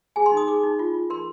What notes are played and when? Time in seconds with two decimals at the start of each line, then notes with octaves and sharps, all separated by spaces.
0.16 G#4 G#5
0.26 C6
0.32 D#4
0.37 D#6
0.48 G#4 D6
0.63 D#4
0.79 F4
0.94 F4
1.10 A#4 C6